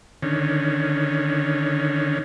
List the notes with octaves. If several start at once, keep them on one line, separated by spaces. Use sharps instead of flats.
D3 D#3 C#4